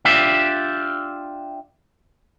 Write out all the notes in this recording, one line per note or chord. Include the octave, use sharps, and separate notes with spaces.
D4 F4 G4 E5